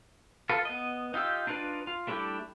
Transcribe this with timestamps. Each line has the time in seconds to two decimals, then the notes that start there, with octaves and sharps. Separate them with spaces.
0.49 F4 A4 B4
0.65 B3 D#5
1.14 D#4 F4 G4 E6
1.47 D4 D#4 F4 B4 D5
1.87 F4
2.07 G3 A3 D4 E4 G4